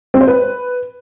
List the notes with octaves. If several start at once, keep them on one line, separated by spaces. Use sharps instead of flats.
C4
C5
B4